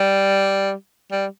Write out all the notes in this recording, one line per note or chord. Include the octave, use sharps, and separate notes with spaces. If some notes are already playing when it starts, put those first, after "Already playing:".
Already playing: G3
G3